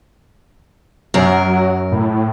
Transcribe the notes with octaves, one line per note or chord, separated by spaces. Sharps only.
F#2 F#3 A#4
A2